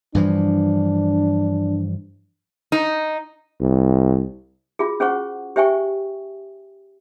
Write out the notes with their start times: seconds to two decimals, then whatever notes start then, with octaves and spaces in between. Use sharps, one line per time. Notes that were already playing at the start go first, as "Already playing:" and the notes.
0.15 G2 E3 F3 D4
2.72 D#4
3.61 C2
4.79 F4 F#4 G#4
5.00 C#4 G#4 C5 F#5 C#6
5.56 G4 C5 E5 G5 G#5 C#6